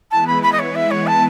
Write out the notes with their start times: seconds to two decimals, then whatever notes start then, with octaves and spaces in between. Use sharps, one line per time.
0.11 E3 G#3 B3 E4 B4 A5
0.27 B5
0.43 B5
0.52 D#5
0.59 C#5
0.75 E5
0.91 C#5
1.07 A5